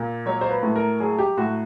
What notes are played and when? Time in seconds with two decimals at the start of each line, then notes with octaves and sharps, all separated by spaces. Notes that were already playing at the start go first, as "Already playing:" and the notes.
Already playing: A#2
0.26 F#3 C#5
0.41 C5
0.50 B4
0.63 A2
0.76 A#4
1.00 F#3 G#4
1.19 G4
1.37 A2 F#4